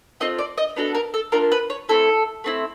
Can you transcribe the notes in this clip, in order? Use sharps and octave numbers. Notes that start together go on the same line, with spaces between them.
A3 C4 F4 D#5
D5
D#5
B3 D4 F#4 A4
A#4
A4
A#3 D4 F4 A#4
B4
C#5
A3 C4 E4 A4
A3 C4 E4